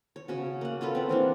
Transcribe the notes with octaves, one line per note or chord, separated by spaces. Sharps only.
C#5
C#3 C#4 F#4
A#3 F#5
C#4 F4 A4 B4
C4 F#5
E3 A#3 D4